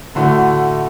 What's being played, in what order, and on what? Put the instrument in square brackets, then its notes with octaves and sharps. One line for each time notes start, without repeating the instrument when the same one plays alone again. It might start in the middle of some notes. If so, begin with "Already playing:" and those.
[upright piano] A2 D3 A3 F#4